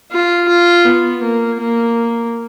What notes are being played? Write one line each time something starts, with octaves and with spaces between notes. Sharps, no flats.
F4
F4
B3
A#3
A#3